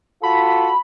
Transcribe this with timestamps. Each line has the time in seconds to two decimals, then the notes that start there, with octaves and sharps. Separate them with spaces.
0.23 F4 F#4 A4 B5